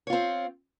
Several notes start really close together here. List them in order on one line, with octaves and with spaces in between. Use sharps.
C#5 F4 C4